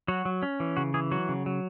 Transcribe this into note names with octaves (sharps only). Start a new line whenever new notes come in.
F#3 F#4
F#3
C#4
E3
C#3 F#4
E3 G#4
F#3 F#4
C#3
F#3